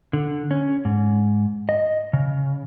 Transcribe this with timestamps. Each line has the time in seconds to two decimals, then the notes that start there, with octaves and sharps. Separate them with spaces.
0.13 D3
0.51 C#4
0.85 G#2
1.69 D#5
2.13 C#3